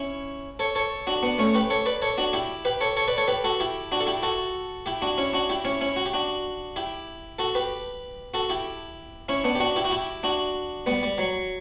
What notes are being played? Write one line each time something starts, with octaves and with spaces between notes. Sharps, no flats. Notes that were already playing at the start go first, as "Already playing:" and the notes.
Already playing: C#4 E4
A4 C#5
A4 C#5
D4 F#4
B3 D4
A3 C#4
G4 B4
A4 C#5
B4 D5
A4 C#5
D4 F#4
E4 G4
G4 B4
A4 C#5
A4 C#5
B4 D5
A4 C#5
G4 B4
F#4 A4
E4 G4
D4 F#4
A4
E4 G4
F#4 A4
E4 G4
D4 F#4
C#4 E4
D4 F#4
E4 G4
C#4 E4
C#4 E4
F#4
G4
D4 F#4
E4 G4
F#4 A4
G4 B4
F#4 A4
E4 G4
C#4 E4
B3 D4
G4
D4 F#4
E4 G4
F#4
E4 G4
D4 F#4
G3 B3
G3
F#3